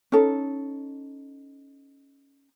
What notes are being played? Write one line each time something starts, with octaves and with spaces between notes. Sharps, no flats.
C#4 D#4 A4